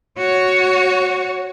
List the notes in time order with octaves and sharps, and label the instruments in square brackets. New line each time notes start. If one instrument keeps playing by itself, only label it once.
[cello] F#4 C#5